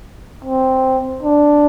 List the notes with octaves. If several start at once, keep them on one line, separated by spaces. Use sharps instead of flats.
C4
D4